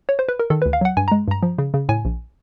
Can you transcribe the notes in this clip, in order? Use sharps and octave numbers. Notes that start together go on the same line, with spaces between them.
C#5
C5
B4
A#4
D#3 A4
D2 B4
F5
F#3 F#5
G2 G#5
G#3 A#5
G2 A#5
F3
C#3
C#3
A2 G#5
A#1